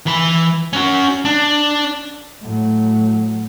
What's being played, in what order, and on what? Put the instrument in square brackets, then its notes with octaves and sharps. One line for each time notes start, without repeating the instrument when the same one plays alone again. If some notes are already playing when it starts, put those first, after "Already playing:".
[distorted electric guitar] E3 B5
C#4 F#4
D4
[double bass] A2 F#3